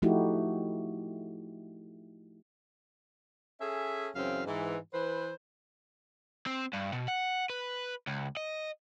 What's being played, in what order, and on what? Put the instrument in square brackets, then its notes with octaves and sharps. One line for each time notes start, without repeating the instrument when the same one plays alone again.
[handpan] F3 A3 D#4 E4 F#4 G4
[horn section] C#4 G#4 A4 E5
F#2 C#3 E3 C4 F5
G#2 E3
E3 B4 C5
[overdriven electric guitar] C4
G2
B2
F#5
B4
C#2
D#5